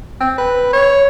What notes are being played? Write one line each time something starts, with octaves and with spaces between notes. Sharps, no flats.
C4
B4
C#5